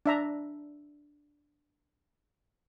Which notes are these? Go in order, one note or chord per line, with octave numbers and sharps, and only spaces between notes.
D4 E5 A#5